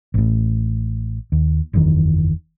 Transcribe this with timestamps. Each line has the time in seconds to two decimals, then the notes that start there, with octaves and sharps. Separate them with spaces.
0.14 A1 A2
1.32 D#2
1.73 F#1 E2 D#3